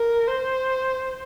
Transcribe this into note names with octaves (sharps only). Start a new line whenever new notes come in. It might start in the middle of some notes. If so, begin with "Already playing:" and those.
Already playing: A#4
C5